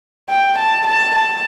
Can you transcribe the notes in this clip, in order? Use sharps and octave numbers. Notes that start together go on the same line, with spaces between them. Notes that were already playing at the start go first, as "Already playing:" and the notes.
G5
A5
A5
A5